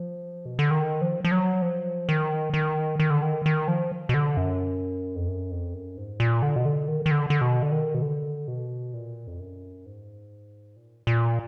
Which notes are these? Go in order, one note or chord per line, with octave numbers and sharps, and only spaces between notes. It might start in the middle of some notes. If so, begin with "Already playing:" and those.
Already playing: F3
B2
D3
D#3
F3
F3
F#3
F3
D#3
D#3
D#3
D3
D#3
D#3
F3
B2
D3
F#2
F2
F#2
F2
F#2
G#2
A#2
D3
B2
D3
D#3
D#3
D3
D3
B2
D3
D#3
B2
D3
B2
A#2
F2
F#2
G#2
A#2
A#2